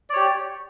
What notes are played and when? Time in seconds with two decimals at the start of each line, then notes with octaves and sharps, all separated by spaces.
0.10 D5
0.13 C#5
0.16 G4